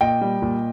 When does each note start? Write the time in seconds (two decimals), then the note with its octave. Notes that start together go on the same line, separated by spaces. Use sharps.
0.01 A#2 D#5 G5
0.21 G3
0.42 A#2